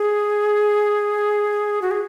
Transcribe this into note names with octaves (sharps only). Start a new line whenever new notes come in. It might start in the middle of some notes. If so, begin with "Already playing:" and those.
Already playing: G#4
F#4
G#4